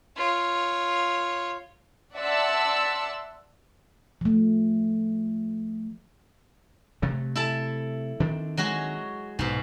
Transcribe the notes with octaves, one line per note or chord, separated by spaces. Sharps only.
F4 C#5
D5 E5 F#5 A5 C6 E6
F3 A3
C3 F#3 A3
E4 A4 A5
D#3 C4 D4
F#3 G#3 F#4
B1 G#2 B2